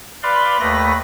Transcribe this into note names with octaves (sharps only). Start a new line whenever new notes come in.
B4 D5 F5 B5 C6
D#2 A3 B4 B5 A#6